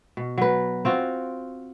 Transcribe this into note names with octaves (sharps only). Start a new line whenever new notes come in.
B2
F#3 B4
C4 F4 F#4